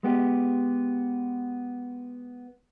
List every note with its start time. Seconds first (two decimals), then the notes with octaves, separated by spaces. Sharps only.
0.03 G#3 B3 G4